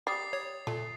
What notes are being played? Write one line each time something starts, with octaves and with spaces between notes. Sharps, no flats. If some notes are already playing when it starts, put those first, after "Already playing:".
G3 D#6 A6 C7
C#5
A#2 A3